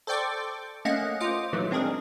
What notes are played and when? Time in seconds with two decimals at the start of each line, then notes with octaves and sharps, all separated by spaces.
0.07 A4 C5 D5 G5 C#6 D6
0.85 A3 A#3 C#4 D#5 F5 F#5
1.20 F4 C5 D#5 D6
1.53 A#2 D#3 E3 F#3 A3
1.71 G#3 C4 D4 G#4 A#4